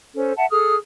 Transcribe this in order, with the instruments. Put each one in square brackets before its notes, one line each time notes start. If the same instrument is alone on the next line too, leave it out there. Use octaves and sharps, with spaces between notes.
[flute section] C#4 A4 C5
E5 F#5 A5
G#4 A4 D#6 F6